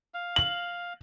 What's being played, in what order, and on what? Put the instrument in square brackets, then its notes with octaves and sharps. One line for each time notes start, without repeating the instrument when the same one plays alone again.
[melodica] F5
[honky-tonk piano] F#7